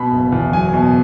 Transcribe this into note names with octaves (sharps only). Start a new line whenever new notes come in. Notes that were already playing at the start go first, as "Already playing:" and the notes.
Already playing: B2 B5
F#1
E2
F#3 G#5
B2